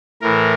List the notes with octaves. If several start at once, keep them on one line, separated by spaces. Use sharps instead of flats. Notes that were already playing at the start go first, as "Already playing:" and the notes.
A2 E3 A#4